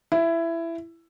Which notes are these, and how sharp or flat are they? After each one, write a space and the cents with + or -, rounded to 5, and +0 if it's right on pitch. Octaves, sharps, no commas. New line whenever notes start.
E4 +15